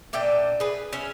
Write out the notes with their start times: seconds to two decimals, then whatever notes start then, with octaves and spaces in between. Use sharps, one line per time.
0.13 A#2 D4 E5 G5
0.60 G#4 B4
0.93 C#4 E5